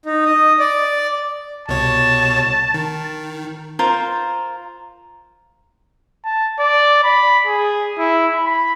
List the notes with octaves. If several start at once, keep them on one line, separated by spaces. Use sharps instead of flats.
D#4
D#5
D5
C2 B2 C#5 A5
D#3
F4 A#4 C5
A5
D5
B5
G#4
E4
B5